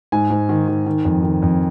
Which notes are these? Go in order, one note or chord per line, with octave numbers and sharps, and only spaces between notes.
G#2 G#5
G#2
D#3
D#3
D#3
F2
D#3
F2